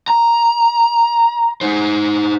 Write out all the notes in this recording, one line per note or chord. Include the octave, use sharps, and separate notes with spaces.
A#5
D#4 C5